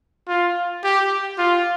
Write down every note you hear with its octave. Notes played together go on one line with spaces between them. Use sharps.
F4
G4
F4